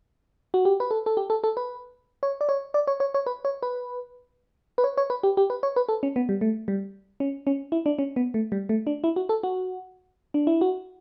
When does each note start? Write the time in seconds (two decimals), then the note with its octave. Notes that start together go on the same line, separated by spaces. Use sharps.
0.54 F#4
0.65 G4
0.80 B4
0.91 A4
1.06 A4
1.17 G4
1.30 A4
1.44 A4
1.57 B4
2.23 C#5
2.41 D5
2.49 C#5
2.74 D5
2.87 C#5
3.00 C#5
3.14 C#5
3.26 B4
3.45 C#5
3.63 B4
4.78 B4
4.84 C#5
4.97 C#5
5.10 B4
5.23 G4
5.37 G4
5.50 B4
5.63 C#5
5.76 B4
5.89 A4
6.03 C#4
6.16 B3
6.29 G3
6.41 A3
6.68 G3
7.20 C#4
7.47 C#4
7.72 E4
7.86 D4
7.99 C#4
8.16 B3
8.34 A3
8.52 G3
8.69 A3
8.87 D4
9.04 E4
9.16 F#4
9.29 A4
9.43 F#4
10.34 D4
10.47 E4
10.61 F#4